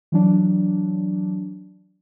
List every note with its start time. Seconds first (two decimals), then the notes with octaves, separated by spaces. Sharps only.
0.12 E3 F#3 D4